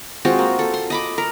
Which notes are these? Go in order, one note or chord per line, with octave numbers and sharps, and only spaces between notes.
G#3 C4 F4 F#4
A#3
A4
C6
D#5 B5 D6
A#4